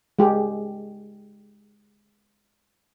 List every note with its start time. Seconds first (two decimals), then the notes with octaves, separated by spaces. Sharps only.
0.19 G#3 G4 G#4